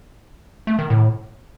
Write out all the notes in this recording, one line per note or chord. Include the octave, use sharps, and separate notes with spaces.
A3
D#3
A2